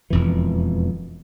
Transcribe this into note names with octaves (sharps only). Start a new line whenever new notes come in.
E1 F2 E3